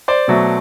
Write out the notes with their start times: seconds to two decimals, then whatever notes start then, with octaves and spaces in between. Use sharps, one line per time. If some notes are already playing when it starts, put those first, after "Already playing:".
0.08 C5 D5
0.28 B2 F#3 A3